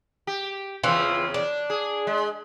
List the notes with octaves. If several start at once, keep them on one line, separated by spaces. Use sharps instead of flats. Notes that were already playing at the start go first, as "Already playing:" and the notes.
G4
E2 C#3 E3 C4 F4
D4
G#4
G#3